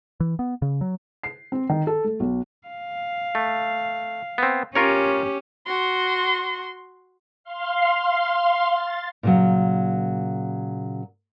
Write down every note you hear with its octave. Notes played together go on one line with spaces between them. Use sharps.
E3
B3
C#3
F#3
C7
C4
D#3
A4
A3
B1
F5
A3
B3 C4
C#4 F4 G4 A#4 C#5
F#4 C6
F5 C6
A6
A#2 C#3 F#3